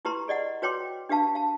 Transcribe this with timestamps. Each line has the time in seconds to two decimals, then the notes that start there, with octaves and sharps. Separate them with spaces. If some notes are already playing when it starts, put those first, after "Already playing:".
0.05 E4 G4 B4 A#5 C6
0.28 G#4 D5 D#5 F#5
0.62 F#4 B4 C#5 G5 C6 D6
1.09 D4 G4 B4 F5 A5
1.35 F5 A5